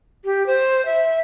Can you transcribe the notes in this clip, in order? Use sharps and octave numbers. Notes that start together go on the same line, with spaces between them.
G4
C5
E5